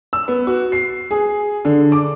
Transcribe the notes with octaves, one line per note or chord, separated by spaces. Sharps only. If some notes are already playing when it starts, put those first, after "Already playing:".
E6
B3
F#4
C7
G#4
D3
D6